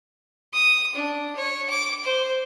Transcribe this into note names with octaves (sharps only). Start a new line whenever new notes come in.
D#6
D4
C#5
D6
C5